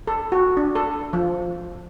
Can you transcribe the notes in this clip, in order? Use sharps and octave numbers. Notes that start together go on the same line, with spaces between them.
A4
F#4
D4
A4
F3